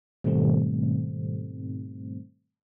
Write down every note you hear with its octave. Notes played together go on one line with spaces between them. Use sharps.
G#2 B2 D#3 G3 A3 C4